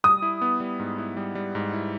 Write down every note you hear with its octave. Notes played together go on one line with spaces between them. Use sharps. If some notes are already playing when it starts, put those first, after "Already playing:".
G3 D#6
E4
B3
G3
G#2
E4
G3
G3
G#2
E4